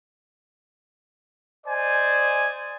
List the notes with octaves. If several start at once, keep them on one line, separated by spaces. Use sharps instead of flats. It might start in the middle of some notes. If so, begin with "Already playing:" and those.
C5 D5 D#5 G#5